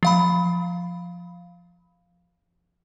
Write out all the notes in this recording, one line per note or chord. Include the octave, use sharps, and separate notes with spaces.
F3 F5 B5